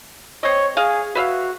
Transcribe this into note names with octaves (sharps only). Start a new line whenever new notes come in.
C4 C#5 D#5
G#4 D#5 F5
F#4 B4 E5 F5